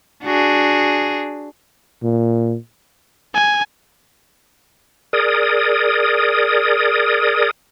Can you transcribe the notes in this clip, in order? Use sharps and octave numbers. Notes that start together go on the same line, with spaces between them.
D4 F#4 G#4
A#2
G#5
G#4 A#4 D5 D#6